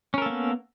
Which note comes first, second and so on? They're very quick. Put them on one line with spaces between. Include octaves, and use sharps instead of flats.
C#4 A#4 A4 A#3 B3